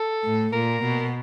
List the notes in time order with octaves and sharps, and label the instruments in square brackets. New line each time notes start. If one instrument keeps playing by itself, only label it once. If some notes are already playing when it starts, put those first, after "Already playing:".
Already playing: [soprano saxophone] A4
[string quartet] A2
[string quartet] A#2 [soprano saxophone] A#4
[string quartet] B2